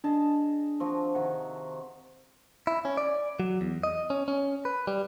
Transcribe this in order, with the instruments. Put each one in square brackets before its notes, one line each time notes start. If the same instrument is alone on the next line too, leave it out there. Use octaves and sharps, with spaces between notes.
[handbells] D4 [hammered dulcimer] G#4 D#5 A5
[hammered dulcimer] F3 C4 F#4
[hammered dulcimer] C3 D#3 [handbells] F#5
[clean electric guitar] E4
C#4
D5
F#3
E2
D#5
C#4
C#4
B4
G3